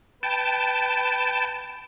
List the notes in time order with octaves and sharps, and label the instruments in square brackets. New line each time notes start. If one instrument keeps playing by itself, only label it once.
[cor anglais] B4 [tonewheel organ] G5 A5